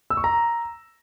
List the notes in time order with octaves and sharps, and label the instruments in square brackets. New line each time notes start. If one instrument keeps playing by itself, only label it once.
[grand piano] E6
C#6
A#5